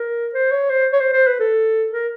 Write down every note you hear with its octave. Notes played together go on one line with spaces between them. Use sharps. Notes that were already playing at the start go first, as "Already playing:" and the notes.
Already playing: A#4
C5
C#5
C5
C#5
C5
C5
B4
A4
A#4